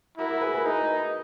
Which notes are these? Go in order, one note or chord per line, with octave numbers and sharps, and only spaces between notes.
E4 F#4 A#4
F#4 A#4
G#4 B4
G#4 B4
D#4 G#4 B4